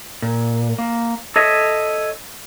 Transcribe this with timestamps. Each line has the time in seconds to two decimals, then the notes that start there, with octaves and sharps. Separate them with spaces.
0.22 A#2
0.78 A#3
1.36 A4 C#5 D#5 E5